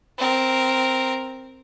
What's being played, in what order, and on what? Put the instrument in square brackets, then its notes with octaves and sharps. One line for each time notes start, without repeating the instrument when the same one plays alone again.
[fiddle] C4 A#4